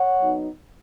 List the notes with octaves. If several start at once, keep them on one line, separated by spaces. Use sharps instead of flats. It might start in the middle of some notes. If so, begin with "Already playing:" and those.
Already playing: C#5 F#5
F#3 B3 D#4